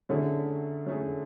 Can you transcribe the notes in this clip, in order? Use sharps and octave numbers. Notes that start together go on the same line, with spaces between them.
D3 F#3 A3 C#4 E4 G#4
F#3 A3 C#4 E4 G#4